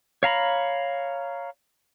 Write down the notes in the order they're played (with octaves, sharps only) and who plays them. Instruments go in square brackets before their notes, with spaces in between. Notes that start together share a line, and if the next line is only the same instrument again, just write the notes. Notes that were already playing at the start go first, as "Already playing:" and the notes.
[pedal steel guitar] C#5 F5 A#5 B5